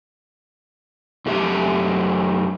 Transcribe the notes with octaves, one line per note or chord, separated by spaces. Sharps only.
F#2 A3 G4 E5